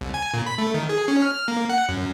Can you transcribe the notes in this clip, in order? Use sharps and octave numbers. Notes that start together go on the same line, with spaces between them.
C2
G#5
A#2
B5
A3
D#3
G#4
C#4
F6
A#3
F#5
F#2